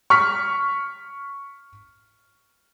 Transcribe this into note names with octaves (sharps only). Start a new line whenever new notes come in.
C#6 F6 B6